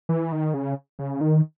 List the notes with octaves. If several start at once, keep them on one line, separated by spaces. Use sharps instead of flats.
E3
D#3
C#3
C#3
D#3